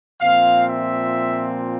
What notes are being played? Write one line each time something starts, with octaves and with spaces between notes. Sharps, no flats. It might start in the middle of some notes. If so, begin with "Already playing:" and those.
A#2 F3 C4 F5
E5